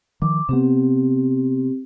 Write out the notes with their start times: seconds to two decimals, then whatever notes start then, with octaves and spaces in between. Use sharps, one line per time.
0.22 D#3 F3 D6
0.49 C3 B3 C4 G4